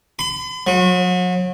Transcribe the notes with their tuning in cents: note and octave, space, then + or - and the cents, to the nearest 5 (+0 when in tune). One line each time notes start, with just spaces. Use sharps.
B5 +45
F#3 -35